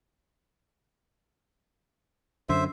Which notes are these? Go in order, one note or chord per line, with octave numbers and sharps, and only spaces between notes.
F#2 D3 C5 E5